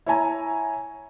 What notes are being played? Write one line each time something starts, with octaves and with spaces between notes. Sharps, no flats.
E4 C#5 G#5 A#5